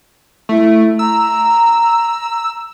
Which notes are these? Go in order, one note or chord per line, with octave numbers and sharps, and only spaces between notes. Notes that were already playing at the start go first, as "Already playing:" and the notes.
A3 E4
A#5 E6